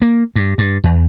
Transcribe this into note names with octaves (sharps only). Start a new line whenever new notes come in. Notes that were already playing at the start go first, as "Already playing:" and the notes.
A#3
G2
G2
E2